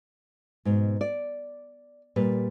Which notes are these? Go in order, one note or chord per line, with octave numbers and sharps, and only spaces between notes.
G#2 B2
D5
A#2 G3 B4